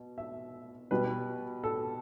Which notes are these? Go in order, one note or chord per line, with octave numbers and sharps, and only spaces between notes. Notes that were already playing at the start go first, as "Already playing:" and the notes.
Already playing: B2
E5
B2 G3 B4
A4